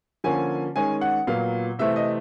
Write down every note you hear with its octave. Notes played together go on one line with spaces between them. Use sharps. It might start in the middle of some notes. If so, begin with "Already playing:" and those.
D3 F3 A#3 C#4 G#5
D#3 G#3 C#4 G#5
F#5
A#2 F#3 B3 F5
C3 E3 A3 C4 E5
D#5